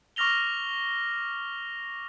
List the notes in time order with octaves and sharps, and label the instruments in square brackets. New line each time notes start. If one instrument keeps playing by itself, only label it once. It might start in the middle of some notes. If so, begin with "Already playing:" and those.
[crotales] C#6 D6 F6 A#6 F7 G7